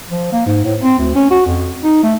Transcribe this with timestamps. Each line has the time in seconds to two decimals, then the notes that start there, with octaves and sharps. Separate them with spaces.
0.11 F3
0.32 A#3
0.46 G#2
0.64 A2
0.81 C4
0.98 D2
1.15 C#4
1.31 F#4
1.46 F2
1.84 D#4
2.03 A3